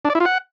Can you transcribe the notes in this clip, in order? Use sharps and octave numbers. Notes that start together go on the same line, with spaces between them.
D4
D5
E4
F4
F#5